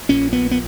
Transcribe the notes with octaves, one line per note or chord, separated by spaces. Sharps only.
A#1 A#2 C#4
B3
B3